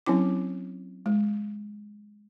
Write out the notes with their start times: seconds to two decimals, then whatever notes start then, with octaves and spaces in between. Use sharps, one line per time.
0.06 F#3 C4 C#4 E4 D6
1.06 G#3